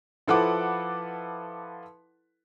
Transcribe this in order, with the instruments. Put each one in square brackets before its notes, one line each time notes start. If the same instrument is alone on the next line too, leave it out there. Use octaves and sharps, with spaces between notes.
[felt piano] F3 E4 A4 B4 F#5 D6